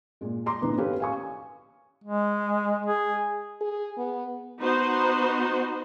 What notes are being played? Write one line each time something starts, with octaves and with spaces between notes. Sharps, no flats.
A#2 G#3
A#5 C6 D6
A#2 D3 E3 B3 D#4
C#4 G4 A4 B4 F5
F5 G#5 C#6
G#3
G#4
G#4
B3
B3 D#4 F#4 C5